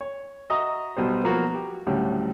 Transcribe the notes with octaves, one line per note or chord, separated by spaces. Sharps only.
C#5
F#4 D#5 E5 A#5 D#6
B1 B2 G3 C5
F3 F#3 A#3 B3 F4 F#4
G4
D2 A2 C#3 F#3 G3